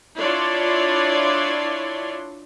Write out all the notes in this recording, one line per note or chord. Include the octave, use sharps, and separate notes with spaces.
D4 E4 F4 C#5 D5 C6